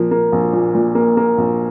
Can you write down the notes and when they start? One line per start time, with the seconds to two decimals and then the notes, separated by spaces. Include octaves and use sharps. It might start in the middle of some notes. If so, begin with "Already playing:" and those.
Already playing: A#2 F3 A#3
0.11 A#3
0.32 A#1
0.53 A#2
0.75 A#2
0.95 A#3
1.17 A#3
1.38 A#1